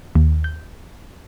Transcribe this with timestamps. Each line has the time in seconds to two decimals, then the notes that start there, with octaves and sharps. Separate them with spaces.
0.15 D#2
0.44 G6